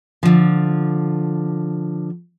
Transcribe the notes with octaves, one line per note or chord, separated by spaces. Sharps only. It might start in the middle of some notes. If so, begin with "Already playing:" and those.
D3 F3